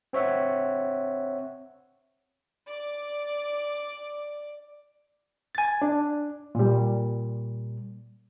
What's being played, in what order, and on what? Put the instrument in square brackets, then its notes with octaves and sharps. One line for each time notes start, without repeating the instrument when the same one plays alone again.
[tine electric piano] C4 C#5 E5 F#5
[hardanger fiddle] D5 D6
[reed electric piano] G#5 A6
D4
A#2 G3